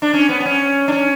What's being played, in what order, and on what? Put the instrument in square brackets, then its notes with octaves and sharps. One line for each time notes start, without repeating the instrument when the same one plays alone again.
[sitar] D4
C#4
B3
B3
C#4
D4
C#4